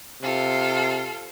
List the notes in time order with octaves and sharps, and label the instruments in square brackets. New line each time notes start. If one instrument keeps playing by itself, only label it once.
[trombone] C3 [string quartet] F4 A4 F5